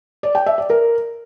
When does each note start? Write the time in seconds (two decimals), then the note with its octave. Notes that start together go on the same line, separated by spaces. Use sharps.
0.23 D5
0.35 G5
0.46 E5
0.58 D5
0.70 A#4